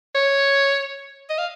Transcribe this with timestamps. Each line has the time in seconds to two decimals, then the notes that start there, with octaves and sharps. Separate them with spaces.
0.15 C#5
1.30 D#5
1.39 F5